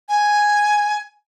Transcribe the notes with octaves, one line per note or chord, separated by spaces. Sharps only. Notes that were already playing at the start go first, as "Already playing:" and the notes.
G#5